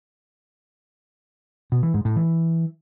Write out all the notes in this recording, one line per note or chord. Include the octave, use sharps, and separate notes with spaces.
B2
E3
G#2
A2
E3